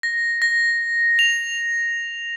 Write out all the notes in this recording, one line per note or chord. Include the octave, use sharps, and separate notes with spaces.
A#6
A#6
F7